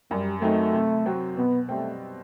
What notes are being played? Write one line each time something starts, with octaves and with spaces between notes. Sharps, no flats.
F#2 G3
F#3 A3 C4 D#4
C3
F#3 C4 F#4
B2 B3
G3 A3 C4